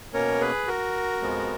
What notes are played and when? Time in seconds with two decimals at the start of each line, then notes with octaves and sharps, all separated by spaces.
0.13 B2 A#3 C#4 A#4 C#5
0.41 G#4 B4
0.67 F#4 A#4
1.21 F2 F3 G#3 B3